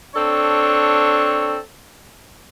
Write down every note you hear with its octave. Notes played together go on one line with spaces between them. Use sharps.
C4 D4 A4 C#5